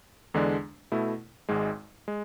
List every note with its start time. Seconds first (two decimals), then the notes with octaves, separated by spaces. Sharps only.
0.34 E2 D3 G#3 D4
0.92 B2 A3 E4
1.49 G#1 G#2 G#3
2.08 G#3